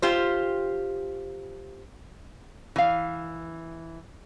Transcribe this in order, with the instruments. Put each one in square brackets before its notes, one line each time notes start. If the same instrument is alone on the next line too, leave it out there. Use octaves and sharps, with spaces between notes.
[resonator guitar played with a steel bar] F4 G4 C5
E3 F5